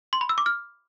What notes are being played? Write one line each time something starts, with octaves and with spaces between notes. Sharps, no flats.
C6
B5
E6
D6
F6